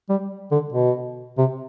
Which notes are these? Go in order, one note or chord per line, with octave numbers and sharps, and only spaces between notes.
G3
D3
B2
C3